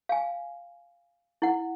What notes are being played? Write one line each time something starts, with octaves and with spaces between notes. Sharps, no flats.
F5 G#5
E4 F#5